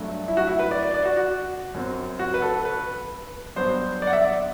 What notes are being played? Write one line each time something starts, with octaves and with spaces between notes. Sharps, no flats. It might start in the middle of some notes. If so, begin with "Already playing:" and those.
Already playing: G2 F#3 A3
E4
F#4
E4
B4
D5
D5
D5
F#4
F#4
F#2 F#3 C4
F#4
B4
A4
B4
G2 F#3 B3 D4 C5
D5
F#5
E5
D5